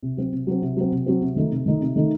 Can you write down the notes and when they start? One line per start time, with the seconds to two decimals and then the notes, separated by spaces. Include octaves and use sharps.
0.02 C3
0.17 F#3 C4
0.32 C3
0.47 F#3 C4
0.62 C3
0.77 F#3 C4
0.92 C3
1.06 F#3 C4
1.21 C3
1.36 D#3 A3 D#4
1.51 C3
1.66 D#3 A3 D#4
1.81 C3
1.96 D#3 A3 D#4